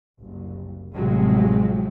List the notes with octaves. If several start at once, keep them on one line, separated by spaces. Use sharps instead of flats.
F#1 C2
A1 A2 C3 F3 F#3 G#3